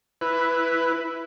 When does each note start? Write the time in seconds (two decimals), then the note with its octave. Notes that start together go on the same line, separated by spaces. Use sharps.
0.21 E4 B4